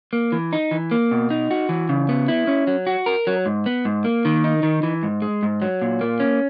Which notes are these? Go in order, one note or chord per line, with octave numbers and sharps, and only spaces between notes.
A#3
E3
D#4
E3
A#3
B2
D#4
F#4
E3
C#3
B3
E4
C#4
F#3
F#4
A#4
F#3
G#2
B3
G#2
A#3
D#3
D#4
D#3
E3
G#2
G#3
G#2
F#3
A#2
A#3
C#4